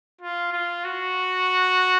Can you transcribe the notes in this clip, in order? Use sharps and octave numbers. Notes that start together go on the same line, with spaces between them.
F4
F4
F#4